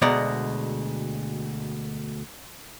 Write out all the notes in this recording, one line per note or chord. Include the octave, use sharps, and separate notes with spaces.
D2 B2 G#3 D5 A#5